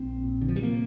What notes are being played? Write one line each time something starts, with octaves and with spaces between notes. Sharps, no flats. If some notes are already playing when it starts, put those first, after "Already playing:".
Already playing: A#1 C4
A#2
D3
F3
G3
C3 A#3